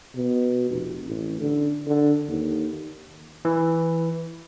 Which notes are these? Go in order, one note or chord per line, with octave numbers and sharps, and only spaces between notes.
B2
F1
A1
D3
D3
D#2
E3